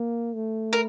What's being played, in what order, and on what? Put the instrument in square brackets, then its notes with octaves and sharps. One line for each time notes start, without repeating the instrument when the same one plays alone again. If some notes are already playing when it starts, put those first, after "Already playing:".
Already playing: [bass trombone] A#3
A3
[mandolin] A#4